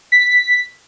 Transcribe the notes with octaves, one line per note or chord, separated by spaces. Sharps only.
B6